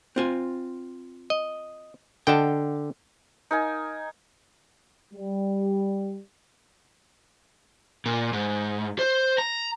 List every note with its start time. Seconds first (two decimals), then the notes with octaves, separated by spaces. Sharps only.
0.16 C4 F4 G#5
1.30 D#5
2.27 D3 D#5 F#5 G5 A5
3.51 D#4 A#4 G#5
5.14 G3
8.06 A#2
8.33 G#2
8.99 C5
9.38 A#5